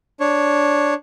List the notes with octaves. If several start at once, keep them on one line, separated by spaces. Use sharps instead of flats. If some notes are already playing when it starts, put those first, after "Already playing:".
D4 C#5